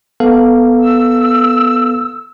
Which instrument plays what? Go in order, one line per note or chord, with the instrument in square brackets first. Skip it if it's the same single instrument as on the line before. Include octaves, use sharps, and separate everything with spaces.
[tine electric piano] B3 A4 F5
[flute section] E6